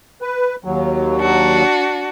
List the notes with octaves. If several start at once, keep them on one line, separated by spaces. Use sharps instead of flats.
B4
D#2 F#3
D4 F#4